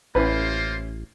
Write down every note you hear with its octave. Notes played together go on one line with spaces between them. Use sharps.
A1 A#3 C#4 E4 F4 B4 C5